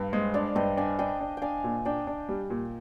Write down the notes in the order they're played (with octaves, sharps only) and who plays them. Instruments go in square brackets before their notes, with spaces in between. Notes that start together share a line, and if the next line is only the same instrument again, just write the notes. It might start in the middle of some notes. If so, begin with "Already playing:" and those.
Already playing: [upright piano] G2 [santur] F5 G5
[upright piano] G#3 [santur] C5 D#5
[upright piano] D4 [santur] D5 F5
[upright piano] G2 [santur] D#5 G5
[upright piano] D4 [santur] F5 G#5
[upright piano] D4 [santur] D#5 G5
[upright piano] D4
[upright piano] D4 [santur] F5 G5 G#5
[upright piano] A#2
[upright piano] D4 [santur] D#5 G5
[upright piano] D4
G3
A#2